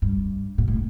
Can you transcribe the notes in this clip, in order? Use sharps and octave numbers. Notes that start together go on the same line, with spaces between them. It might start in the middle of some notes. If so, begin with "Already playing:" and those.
G2
A#2
A2